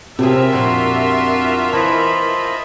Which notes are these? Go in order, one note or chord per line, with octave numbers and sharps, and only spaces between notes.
C3 C4 F4 G4 G#4 A#4 E5
F2 A#2 D4 F#4 C6
E3 C5 D#5 A5 B5